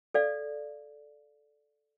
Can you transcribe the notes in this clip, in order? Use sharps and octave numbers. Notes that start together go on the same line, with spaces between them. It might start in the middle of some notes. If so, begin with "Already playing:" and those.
A4 D5 F5